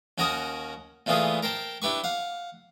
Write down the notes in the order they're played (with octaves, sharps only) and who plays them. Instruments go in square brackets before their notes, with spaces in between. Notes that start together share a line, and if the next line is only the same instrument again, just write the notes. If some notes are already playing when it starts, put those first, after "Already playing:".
[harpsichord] D#2 C#4 F#4 A#4 F#5 D#6
A#2 E3 A3 B3 F4 G#4
A#4 C5 G5 A5
D4 E4 G4 B4 C#6
F5 F#5